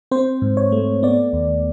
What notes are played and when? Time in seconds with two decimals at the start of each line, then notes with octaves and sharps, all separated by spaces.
0.11 C4 C5
0.42 G#2
0.57 C#5
0.72 A3
1.03 B3 D5
1.33 D#2